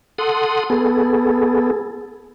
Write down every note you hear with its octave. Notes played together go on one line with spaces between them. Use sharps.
A4 F#5 C6 D#6
B3 G#4 A4